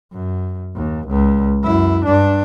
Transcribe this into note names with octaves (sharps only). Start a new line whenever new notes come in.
F#2
D#2
C#2
F#2 E4
G2 D4